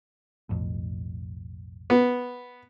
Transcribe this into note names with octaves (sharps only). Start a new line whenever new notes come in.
B1 F2 A2
B3